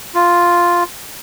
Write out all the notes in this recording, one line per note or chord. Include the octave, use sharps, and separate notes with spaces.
F4